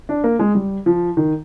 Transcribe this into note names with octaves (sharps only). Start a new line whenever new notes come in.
D4
A#3
G#3
G3
F3
D#3